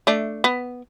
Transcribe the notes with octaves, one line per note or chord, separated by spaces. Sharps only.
A3 D4
B3